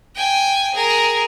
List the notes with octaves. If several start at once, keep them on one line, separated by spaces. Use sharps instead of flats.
G5 G#5
G#4 A#4